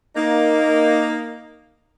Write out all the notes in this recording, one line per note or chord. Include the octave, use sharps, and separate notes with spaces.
A#3 D#4